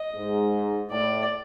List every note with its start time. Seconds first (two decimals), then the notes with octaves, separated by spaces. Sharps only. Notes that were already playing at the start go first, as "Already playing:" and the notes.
Already playing: D#5
0.15 G#2
0.90 A2 D5